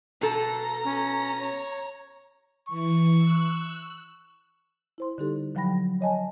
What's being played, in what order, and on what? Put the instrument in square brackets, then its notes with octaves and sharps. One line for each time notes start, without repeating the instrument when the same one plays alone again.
[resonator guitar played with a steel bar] B2 A4 [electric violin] A#5
[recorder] C#4
C#5
[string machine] E3 [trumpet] C#6
[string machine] E6 F#6
[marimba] E4 C5 C6
D3 G3 D#4 G4 A4
D3 F3 F#3 G5 B5 A#6
C#5 D#5 G#5 A5